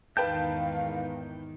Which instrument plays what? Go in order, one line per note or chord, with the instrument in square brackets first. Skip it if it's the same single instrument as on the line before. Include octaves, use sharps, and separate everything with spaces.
[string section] E2 G#2 D#3 [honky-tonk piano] B4 G5 A5 [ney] F5 [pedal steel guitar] G6